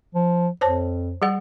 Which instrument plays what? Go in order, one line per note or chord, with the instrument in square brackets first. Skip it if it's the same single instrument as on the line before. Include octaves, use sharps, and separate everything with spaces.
[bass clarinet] F3
[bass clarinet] F2 [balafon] C5 C#5 A5
[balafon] G3 G#4 F#5